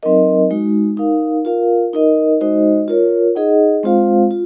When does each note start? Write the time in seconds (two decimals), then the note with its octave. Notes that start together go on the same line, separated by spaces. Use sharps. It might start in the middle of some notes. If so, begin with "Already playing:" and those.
0.03 F#3 C4 D#4 A#4 D#5
0.50 G#3 D#4 F#4
0.97 D#4 A#4 F5
1.45 F4 A#4 F5
1.93 D#4 A#4 D#5
2.41 G#3 D#4 F#4 C5 D#5
2.88 F4 A#4 C#5
3.35 D#4 G#4 D#5 F#5
3.83 G#3 C4 F4 C5 F5
4.31 F4